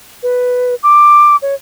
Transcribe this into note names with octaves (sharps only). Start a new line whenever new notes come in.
B4
D6
C#5